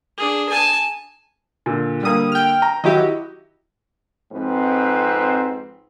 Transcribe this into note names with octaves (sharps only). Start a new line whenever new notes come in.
D4 G#4
G#5 A5
A#2 D3
D3 G3 A#3 D#6
G5 F6
A#5
D#3 F#3 E4 F#4 G4 D#5
F2 G#2 C4 B4